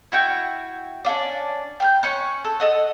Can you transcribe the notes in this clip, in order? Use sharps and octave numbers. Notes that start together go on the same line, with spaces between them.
E4 F#4 G5 F6
C#4 D4 F4 D5
G5 F6 G6
C#4 C#6 F#6
A4
A4 D#5 F#5